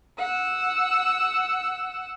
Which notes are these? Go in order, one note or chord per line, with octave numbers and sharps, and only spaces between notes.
F#5 E6